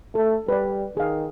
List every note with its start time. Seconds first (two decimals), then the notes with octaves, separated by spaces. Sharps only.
0.15 A3 A4
0.49 G3 B4 D5
0.97 D#3 G#4 F5